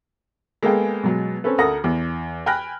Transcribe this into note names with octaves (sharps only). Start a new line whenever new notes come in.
G#3 A#3 B3 G#4 A4 G5
B2 F#3 G#3
C4 C#4 A4 B4
D2 A4 A#4 F#5 D#6 A#6
E2
G5 G#5 B5 F6 F#6 A#6